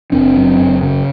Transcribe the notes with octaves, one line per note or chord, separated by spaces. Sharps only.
F#1 C4 D4
F#2
F#1
C#3